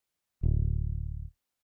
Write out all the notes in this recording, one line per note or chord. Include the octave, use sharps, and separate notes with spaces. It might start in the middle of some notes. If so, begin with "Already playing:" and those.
D1